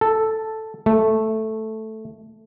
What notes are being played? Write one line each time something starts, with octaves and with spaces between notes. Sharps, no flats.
A4
A3